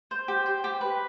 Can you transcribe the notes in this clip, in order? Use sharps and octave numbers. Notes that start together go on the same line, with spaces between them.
C5
G4
C5
G4
B4